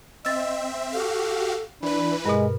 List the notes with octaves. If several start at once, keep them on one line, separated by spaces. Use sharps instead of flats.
C4 D#5 E5 E6 A6
F#4 G4 A4 F5
E3 D4 B4 B5
G2 B2 G#3 A#4